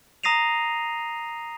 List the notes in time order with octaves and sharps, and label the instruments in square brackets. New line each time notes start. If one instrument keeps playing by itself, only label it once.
[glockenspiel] A#5 D#6 A#6 C7 D#7 F7